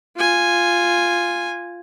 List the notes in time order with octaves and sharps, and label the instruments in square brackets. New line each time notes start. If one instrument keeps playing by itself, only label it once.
[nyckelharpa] F4 G#5